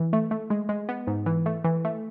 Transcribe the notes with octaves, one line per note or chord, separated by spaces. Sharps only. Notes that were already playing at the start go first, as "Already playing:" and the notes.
Already playing: E3
A3
A3
G#3
G#3
B3
G#2
E3
A3
E3
A3